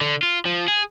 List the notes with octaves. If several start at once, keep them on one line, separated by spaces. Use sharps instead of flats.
D3
F4
F3
G#4